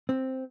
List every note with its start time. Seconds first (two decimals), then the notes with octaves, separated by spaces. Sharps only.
0.09 C4